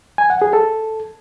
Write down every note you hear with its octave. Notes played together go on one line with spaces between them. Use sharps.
G#5
F#5
G#4
A4